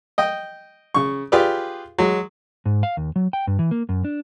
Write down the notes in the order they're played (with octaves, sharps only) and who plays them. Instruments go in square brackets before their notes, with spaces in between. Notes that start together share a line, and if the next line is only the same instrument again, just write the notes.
[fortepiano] D#5 G5
C#3 C#6
F4 G4 G#4 B4 D5
F#3 G#3
[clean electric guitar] G#2
F5
D#2
F#3
G5
G2
E3
A#3
F#2
D4